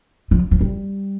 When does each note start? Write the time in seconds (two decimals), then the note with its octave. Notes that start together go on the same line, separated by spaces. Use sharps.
0.31 F3
0.51 F3
0.61 G3